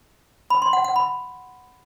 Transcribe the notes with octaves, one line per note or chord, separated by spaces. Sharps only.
B5
C6
F#5
F#5
B5